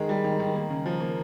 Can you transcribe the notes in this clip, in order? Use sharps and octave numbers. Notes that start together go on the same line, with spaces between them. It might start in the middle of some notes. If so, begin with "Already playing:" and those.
Already playing: D#3 G#3
G3
D#3
D#3
A#3
C#3
F3
A#3